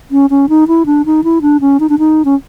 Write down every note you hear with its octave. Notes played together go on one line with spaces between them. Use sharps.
C#4
C#4
D#4
E4
D4
D#4
E4
D4
C#4
D#4
D4
D#4
C#4